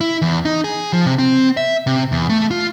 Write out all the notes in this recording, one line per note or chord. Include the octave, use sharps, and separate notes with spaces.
E4
E2
D#4
G#4
F3
C3
C4
E5
C3
E2
A3
F4